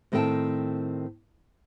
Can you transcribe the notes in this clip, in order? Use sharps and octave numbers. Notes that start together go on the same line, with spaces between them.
A2 D#3 C4 A4 G5 A5